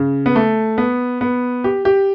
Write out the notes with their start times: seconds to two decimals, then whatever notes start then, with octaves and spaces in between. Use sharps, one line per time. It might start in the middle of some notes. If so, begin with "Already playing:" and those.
Already playing: C#3
0.26 B3
0.36 A3
0.78 B3
1.21 B3
1.64 G4
1.85 G4